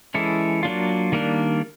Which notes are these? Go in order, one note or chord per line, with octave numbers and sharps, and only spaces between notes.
E3 G#3 C#4 E4 A4
F#3 A#3 D4 F4
D#3 G3 A#3 D4